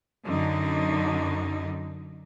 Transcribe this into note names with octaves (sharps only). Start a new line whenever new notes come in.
F#2 D3 D#4